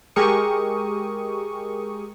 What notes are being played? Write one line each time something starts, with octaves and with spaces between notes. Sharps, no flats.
G#3 G4 G#4 A#4 C#6 D#6